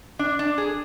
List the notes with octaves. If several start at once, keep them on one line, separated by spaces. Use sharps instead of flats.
D4
D4
G#4